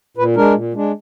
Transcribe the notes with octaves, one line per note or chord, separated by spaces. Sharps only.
A#2 B4
G#3 D4 A#4
A#2
G#3 D4